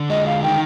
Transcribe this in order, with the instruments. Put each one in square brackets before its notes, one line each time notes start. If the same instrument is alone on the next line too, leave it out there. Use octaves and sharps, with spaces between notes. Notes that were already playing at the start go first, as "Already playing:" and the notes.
Already playing: [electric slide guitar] D3
[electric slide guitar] G#3 [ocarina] D#5
[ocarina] F5
[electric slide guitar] D#3 [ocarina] G5